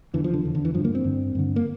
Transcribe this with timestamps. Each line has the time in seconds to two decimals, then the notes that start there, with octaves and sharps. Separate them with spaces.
0.14 E2 D3 E3
0.24 F3
0.34 D3
0.44 E2 D3
0.55 D3
0.65 E3
0.74 G2 D3 F3
0.84 A#3
0.95 C4
1.04 G2 D3
1.35 G2 D3
1.56 A#3